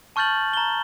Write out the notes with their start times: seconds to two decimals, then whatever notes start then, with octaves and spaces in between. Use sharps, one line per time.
0.16 A5 C#6 F6 G6 A6 F#7
0.53 A#5 G7